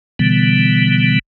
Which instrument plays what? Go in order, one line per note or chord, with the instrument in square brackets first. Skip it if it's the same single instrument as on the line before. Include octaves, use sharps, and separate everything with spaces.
[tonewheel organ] B2 D3 E3 G3 B3